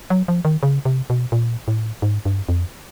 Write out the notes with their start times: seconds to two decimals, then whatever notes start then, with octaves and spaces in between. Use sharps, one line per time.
0.10 F#3
0.28 F3
0.45 D#3
0.63 C#3
0.85 C3
1.10 B2
1.32 A#2
1.68 A2
2.02 G#2
2.25 G2
2.49 F2